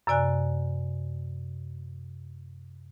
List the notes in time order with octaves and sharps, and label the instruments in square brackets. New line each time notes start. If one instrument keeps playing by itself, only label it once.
[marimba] F#2 C3 D5 G#5 F#6